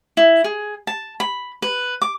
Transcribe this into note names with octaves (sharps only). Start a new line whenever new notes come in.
E4
G#4
A5
B5
B4
D6